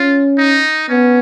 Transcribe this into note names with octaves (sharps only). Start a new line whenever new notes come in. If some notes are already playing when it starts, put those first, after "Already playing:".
Already playing: C#4 F4
D#4
B3 C#4